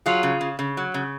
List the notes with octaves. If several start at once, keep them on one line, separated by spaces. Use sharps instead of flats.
F#3 F4 G#4
C#3
C#3
C#3
F#3
C#3